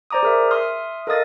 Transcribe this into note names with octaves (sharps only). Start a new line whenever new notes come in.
C5 D5 A#5 D6 D#6
G#4 A#4 E5
E5 C6 D#6 F6
A4 A#4 D#5 F5 D#6 A6